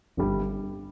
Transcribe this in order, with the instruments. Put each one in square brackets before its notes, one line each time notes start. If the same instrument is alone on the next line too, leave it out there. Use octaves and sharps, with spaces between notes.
[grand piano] G1 G2 G3